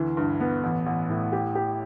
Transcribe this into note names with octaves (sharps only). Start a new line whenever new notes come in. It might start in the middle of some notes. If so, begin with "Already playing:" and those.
Already playing: D2 E3
G2
B3
A1
A1
A2
G4
G4